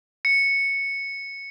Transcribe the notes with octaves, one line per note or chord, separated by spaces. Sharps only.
C#7